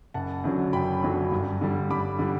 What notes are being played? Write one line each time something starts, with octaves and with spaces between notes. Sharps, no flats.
F#1 F#5 A5
F#2 D3 F#3
F#1 G5 B5
F#2 D3 F#3
G2
D3 G3
G2 B5 D6
D3 G3